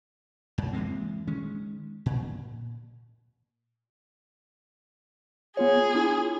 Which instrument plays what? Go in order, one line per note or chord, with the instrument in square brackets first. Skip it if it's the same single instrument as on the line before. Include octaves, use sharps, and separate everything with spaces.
[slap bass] F#2
E3 G#3 A#3 C4
D#3 G#3 C#4
A#2
[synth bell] B3 F4 C#5 [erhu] G#4
[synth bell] D4 E4 F4